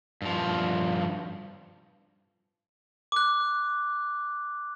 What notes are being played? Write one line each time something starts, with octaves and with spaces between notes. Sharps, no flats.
G2 F3
D6 F#6